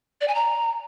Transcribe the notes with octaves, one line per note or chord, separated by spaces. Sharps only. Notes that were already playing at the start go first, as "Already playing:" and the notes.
D5
G#5
A#5